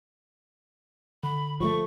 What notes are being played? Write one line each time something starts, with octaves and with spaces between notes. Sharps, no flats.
D3 B5
F3 F#3 A3 C#6